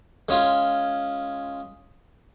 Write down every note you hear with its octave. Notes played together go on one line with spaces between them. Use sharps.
G#3 C#4 F4